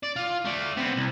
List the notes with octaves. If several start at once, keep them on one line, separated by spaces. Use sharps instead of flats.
D5
F4
A3 D5
B3 C4
C2